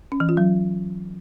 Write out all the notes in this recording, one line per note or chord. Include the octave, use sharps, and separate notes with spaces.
C#4
E3
F4
F#3